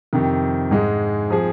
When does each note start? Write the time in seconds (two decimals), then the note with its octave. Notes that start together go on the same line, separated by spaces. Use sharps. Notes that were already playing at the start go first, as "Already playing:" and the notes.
0.13 F2 C3 D#3
0.71 G#2 G#3 D#4
1.30 F3 C4 G#4